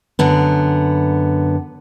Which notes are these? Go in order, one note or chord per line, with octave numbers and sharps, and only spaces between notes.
F#2 D3 B3